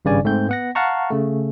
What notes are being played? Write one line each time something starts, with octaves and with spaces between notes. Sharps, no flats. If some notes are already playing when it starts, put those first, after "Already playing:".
G#1 G2 C#3 D5 G#5
G#2 A3 C4 G6
B3 F#5 A#6
F5 F#5 A5 A#5 C#6
C#3 A3